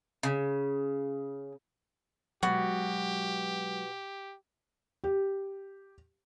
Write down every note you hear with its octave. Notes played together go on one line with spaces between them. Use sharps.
C#3
B2 F#3 G#3 F#4 G4
G4